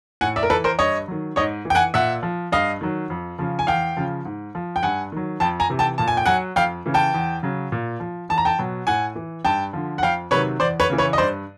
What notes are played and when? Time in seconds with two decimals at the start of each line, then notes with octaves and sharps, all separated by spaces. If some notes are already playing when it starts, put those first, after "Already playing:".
0.21 A2 F#5 G#5
0.36 D5 E5
0.43 A#4
0.50 E3 A4 B4
0.64 A#4 C5
0.79 G2 C#5 D#5
1.08 D#3 F#3
1.36 G#2 C#5 D#5
1.65 E3
1.70 G5
1.75 F#5 G#5
1.94 A#2 E5 F#5
2.23 F3
2.52 G2 D#5 F5
2.81 D#3 F#3
3.10 F2
3.39 C#3 F3
3.59 G#5
3.67 E2 F5 G5
3.97 C#3 F3
4.25 G#2
4.55 F3
4.76 G5
4.83 G2 F#5 G#5
5.12 D#3 F#3
5.40 F2 G5 A5
5.60 G#5 A#5
5.70 C3 E3
5.79 G5 A5
5.98 A#2 A5
6.08 G#5
6.17 G5
6.26 F#3 F#5 G#5
6.56 F2 F5 G5
6.86 C#3 E3
6.94 G5 A5
7.14 E2
7.43 C#3 F#3
7.72 A#2
8.00 F3
8.29 E2 A5
8.38 A#5
8.45 G5 A5
8.59 B2 F#3
8.87 A2 F#5 G#5
9.15 E3
9.45 G2 G5 A5
9.73 D3 F3
9.98 F#5
10.02 F2 F5 G5
10.31 C3 D#3 F#3 B4 C#5
10.60 E2 C5 D5
10.80 B4 C#5
10.90 C#3 E3
10.98 B4 C#5
11.13 D#5
11.18 G2 C5 D5